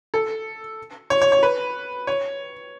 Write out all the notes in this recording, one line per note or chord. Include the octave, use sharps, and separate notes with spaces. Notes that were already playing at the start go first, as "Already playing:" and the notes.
A4
C#5
C#5
C#5
B4
C#5